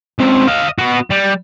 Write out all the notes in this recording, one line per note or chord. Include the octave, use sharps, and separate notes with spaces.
C#2 C4
D#5 F5
B3 F#4
G3